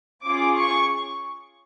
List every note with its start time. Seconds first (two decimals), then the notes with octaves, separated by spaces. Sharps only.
0.25 C#4 F4 G#4 D6
0.56 C#6